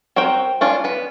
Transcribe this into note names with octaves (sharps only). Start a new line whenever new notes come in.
C4 F#4 A#4 G5
C#4 D4 F4
B3 B4